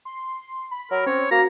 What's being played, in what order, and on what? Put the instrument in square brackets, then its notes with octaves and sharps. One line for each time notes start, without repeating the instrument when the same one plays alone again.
[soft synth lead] C6
B5
[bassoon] F#3 [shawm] A#4
[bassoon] C4 [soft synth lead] C#4 [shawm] C#5
[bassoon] A#3 [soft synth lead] F#4 [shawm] A#5